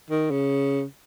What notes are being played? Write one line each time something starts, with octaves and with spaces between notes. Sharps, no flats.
D#3
C#3